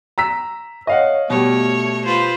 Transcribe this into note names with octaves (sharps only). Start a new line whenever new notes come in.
A#5 E6 B6
C#5 D#5 F5 F#5
B2 G3 A3 C#5
F4 B4 C5